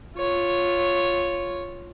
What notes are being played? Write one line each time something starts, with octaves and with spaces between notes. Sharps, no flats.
F4 C#5